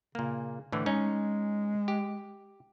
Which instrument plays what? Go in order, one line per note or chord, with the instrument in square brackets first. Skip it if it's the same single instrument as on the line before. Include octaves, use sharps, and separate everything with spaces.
[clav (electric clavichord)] A#2 A#3 [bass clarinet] C#3
[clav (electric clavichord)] A2 D3 E3
[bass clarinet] G#3 [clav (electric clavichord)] C#4 D#4
[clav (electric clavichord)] G4